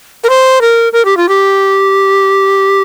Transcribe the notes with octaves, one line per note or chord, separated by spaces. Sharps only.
A#4
C5
A#4
A#4
G4
F4
G4